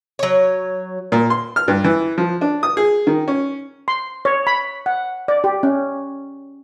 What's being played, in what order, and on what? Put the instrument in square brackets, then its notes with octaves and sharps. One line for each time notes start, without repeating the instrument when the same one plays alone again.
[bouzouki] F#3 C#5
[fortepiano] A#2
C6
F6
G2
E3
F3
D4
D#6
G#4
D#3
C#4
[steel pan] C6
C#5
B5
F#5
D5
G4
C#4